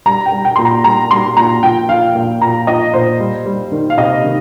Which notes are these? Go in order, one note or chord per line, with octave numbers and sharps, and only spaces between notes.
G3 A#5
G5
G3
G5
A#2 C6
A#5
G3 A#5
G3 C6
A#2 A#5
F3 G5
F3 F5
A#2 F5
A#2 A#5
F3 D#5
A#2 C5
G3
G3
D#3
F5
C3 D#5
D#3